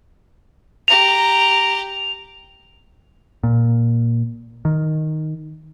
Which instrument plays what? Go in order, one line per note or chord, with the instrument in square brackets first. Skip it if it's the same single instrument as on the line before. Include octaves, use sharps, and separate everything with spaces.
[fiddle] G4 A#5 [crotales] F7
[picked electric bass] A#2
D#3